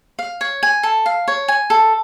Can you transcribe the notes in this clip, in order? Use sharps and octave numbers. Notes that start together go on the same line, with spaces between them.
F5
C#5
G#5
A4
F5
C#5
G#5
A4